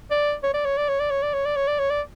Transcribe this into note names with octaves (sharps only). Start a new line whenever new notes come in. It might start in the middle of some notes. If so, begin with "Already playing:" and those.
D5
C#5
D5
C#5
D5
C#5
D5
C#5
D5
C#5
D5
C#5
D5
C#5
D5